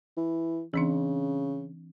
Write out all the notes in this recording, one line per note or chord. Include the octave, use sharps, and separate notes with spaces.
E3
C#3 E3 C4 D4